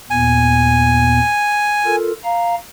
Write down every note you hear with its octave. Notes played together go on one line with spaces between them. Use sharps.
D#2 A#2 B3 G#5
F4 A4 A#4
F5 A#5